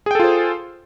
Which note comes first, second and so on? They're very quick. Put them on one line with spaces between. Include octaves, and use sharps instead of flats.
G#4 G5 A4 F4 C5